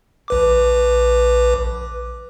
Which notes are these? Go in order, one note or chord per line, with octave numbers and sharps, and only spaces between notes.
A#1 B4 D6